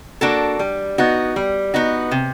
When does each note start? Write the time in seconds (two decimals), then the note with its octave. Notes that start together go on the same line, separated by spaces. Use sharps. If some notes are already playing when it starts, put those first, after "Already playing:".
0.21 A#3 D4 F#4 A4
0.59 G3
0.98 B3 D#4 F#4
1.36 G3
1.74 B3 D#4 F#4
2.11 C3